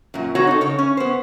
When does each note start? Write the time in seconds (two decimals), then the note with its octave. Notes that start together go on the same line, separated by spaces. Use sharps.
0.14 F#2 A#2
0.35 C4 F#4 C#5 F#5 A#5
0.47 D#4 A4
0.61 C#3 C#5
0.78 C#4
0.97 B3 C5